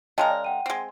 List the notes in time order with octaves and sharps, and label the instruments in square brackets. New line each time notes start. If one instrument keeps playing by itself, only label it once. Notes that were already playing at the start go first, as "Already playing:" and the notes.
[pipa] C#3 G#3 A#4 [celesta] D#5 G5 A5
[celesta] D5
F#5 G5 D#7
[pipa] G#3 C4